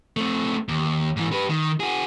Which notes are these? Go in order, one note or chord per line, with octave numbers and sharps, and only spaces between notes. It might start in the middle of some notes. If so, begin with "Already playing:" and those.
A3 C4
D#2
G#2 E3
G4 B4
D#3
F#4 G#4